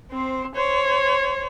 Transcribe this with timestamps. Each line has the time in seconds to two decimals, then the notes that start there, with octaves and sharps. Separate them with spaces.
0.12 C4 C5
0.55 C5 C#5